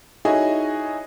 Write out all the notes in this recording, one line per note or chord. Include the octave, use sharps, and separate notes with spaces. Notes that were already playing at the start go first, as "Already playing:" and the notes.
D#4 E4 F#4 G#4 C#5 D#5